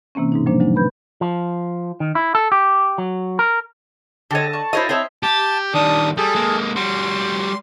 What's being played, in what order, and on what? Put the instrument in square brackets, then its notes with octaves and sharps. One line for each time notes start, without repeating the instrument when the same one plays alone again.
[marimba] C3 E3 A#3 C4 C#4
G#2 B2 D#4
F3 G3 A#3 D4 C5
D3 F#3 G#3 C4 D#4
B4 B5 G6
[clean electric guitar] F3
D#3
E4
A4
G4
F#3
A#4
[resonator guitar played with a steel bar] D3 D#5 [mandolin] G4 A4 C#5 [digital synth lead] A5
[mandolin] D5 C#6
[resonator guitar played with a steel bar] E4 C#5 D#5 [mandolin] F#4 A#4 C5
[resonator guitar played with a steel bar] C4 E4 C#5 [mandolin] C5 D#5 E5
[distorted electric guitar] G4 [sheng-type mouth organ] A5
[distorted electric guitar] D#3 G3 [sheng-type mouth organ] D4 D#6
[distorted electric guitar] G3 [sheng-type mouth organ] G#4 A4
[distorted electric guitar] G#3 A#3
[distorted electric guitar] G3 F#4 [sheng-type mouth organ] C6